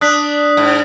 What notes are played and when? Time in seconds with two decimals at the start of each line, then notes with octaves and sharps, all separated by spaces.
0.01 D4 D#6 F#6 B6
0.57 G#2